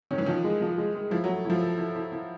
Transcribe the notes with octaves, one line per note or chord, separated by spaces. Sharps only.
D#3 C#4
E3
D#3 F3
G#3
F3
G#3
G#3
F3 E4
F#3
A3
F3 E4
A4
E4
E4
E4